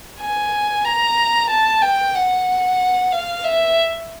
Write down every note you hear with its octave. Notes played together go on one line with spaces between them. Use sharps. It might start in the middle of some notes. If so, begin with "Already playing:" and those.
G#5
A#5
A5
G5
F#5
F5
E5